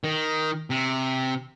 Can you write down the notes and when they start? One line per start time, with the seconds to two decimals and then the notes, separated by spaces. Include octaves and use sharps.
0.04 D#3
0.70 C3